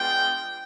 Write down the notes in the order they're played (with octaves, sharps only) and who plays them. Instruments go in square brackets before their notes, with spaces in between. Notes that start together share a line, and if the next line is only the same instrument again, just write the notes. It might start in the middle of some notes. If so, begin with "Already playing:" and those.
Already playing: [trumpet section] G#3 B3 D4 F4 G5